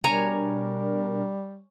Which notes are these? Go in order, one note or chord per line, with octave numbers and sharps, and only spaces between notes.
B2 G3 D4 A#4 C#5 G#5 A#5